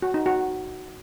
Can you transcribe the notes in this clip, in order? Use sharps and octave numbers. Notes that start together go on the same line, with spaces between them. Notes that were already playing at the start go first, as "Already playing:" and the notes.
F#4
D#4
F#4